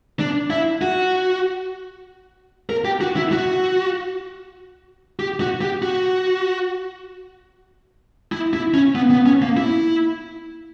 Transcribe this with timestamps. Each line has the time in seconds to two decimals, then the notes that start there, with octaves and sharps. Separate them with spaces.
0.19 D4
0.50 E4
0.82 F#4
2.70 A#4
2.85 G4
3.01 F#4
3.16 E4
3.32 F#4
5.19 G4
5.40 F#4
5.61 G4
5.82 F#4
8.32 E4
8.53 E4
8.74 C#4
8.95 B3
9.10 B3
9.26 C#4
9.42 A#3
9.57 E4